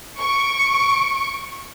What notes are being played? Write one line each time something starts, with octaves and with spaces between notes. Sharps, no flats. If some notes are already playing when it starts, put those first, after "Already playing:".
C#6 D7